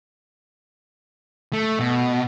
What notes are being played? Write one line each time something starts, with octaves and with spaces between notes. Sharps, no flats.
A3
B2